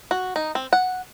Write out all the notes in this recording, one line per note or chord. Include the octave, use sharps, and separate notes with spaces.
F#4
D#4
C4
F#5